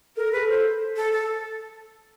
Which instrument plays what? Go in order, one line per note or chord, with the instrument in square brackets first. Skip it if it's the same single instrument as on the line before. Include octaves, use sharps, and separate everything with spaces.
[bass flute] A4 [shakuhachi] A#4
[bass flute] G#4 [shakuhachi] B4
[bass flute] A4
[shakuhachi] C5
A4
A4